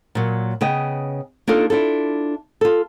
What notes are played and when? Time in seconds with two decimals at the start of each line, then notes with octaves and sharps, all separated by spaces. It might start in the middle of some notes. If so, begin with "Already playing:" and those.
0.15 A#2 F#3
0.61 C#3 B3 D#5 G5
1.47 A#3 D4 D#4 F4 A4
1.70 D4 E4 F4 A4
2.61 F4 A4